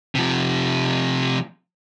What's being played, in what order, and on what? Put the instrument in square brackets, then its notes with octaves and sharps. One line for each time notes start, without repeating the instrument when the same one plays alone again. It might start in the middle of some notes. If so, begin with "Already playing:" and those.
[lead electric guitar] C3 F3